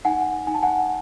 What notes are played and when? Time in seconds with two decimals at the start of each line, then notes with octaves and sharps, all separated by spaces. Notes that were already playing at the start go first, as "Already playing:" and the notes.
0.05 D#4 F#5 G#5
0.47 D#4 G#5
0.55 A5
0.63 F#5 G#5